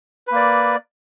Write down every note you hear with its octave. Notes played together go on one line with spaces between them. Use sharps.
A#3 B4 D5